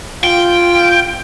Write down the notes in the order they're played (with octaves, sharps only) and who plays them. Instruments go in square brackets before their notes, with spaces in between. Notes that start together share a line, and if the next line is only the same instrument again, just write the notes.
[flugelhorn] F4 [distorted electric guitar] G5